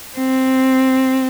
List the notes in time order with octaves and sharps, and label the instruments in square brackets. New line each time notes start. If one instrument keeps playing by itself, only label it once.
[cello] C4